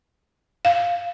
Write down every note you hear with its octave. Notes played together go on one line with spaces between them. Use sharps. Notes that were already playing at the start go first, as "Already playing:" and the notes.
F5